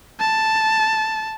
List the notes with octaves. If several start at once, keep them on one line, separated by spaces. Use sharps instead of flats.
A5